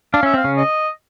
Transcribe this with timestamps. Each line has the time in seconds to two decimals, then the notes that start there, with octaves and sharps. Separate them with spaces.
0.13 D4 F5
0.23 C#4 E5
0.34 C4 F5
0.44 C#3 C#4
0.57 D#5